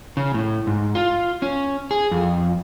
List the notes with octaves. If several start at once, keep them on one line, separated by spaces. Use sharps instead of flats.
C#3
A2
G#2
F4
C#4
G#4
F2